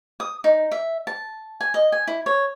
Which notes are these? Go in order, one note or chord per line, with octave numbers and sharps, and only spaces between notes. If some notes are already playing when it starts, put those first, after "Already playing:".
D#6
D#4
E5
A5
G#5
D#5
G#5
E4
C#5